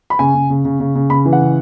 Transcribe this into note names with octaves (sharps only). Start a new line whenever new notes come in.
B5
C#3 G#5
C#3
C#3
C#3
C#3
C#3
C#3 B5
E3
F#5
C#3